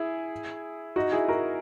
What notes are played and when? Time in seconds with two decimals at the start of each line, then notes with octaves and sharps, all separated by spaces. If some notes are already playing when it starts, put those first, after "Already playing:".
Already playing: E4 G#4
0.96 D#4 F#4
1.12 E4 G#4
1.28 F#4 A#4